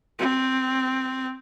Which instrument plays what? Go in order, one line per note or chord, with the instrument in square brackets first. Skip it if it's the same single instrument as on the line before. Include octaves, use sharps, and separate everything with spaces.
[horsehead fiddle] C4